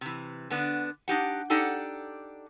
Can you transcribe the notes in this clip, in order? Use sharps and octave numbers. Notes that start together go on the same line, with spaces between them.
C3 E3
D3 B3 D4
D4 D#4 G4 F#5
D4 D#4 G4 A4 F#5